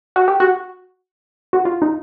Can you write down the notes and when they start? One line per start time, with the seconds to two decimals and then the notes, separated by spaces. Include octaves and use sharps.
0.16 F#4
0.28 G4
0.40 F#4
1.53 F#4
1.65 F4
1.82 D#4